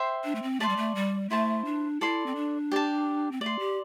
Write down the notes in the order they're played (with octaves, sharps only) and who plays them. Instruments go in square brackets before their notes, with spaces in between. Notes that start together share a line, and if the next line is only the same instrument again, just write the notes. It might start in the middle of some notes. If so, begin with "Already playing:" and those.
Already playing: [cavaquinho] C5 E5 G5 C6
[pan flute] D4
A3
C4
[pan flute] A3 [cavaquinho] D5 A5 C6
[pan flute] G3
A3
G3
[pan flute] A3 [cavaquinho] E4 C5 A5
[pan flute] D4
[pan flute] E4 [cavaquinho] A4 D5 C6
[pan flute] C4
D4
[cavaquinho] G4 D5 A5
[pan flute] C4
[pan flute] A3 [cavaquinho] D5 C6
[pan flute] G4